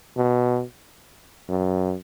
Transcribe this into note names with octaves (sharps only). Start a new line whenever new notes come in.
B2
F#2